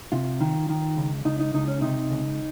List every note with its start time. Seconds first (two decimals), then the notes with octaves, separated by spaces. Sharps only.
0.12 C3 F4
0.41 D#3
0.70 D#3
0.97 C#2
1.25 C#2 D#4
1.40 D#4
1.54 C#2 D#4
1.68 C#4
1.81 C3 D#4
2.11 C#2